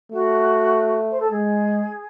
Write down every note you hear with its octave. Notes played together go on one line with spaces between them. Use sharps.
A3 F#4
C5
A4
G#3 G#4